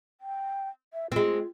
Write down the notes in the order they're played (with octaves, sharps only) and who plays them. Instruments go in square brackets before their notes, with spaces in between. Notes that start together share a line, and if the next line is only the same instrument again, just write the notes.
[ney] G5
E5
[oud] G#3 C4 [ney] F4